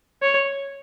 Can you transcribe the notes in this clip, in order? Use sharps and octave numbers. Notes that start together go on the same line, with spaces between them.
C#5